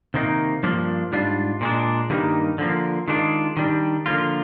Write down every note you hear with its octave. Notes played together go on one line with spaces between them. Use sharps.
C3 D#3 A#3 D#4
G2 F3 A#3 D4
G#2 G3 D4 F4
A#2 G#3 D4
G2 D#3 G3 A#3 D#4
D3 F3 A#3
D#3 G#3 D4 F4
D#3 G3 D4
D3 F3 A#3 F4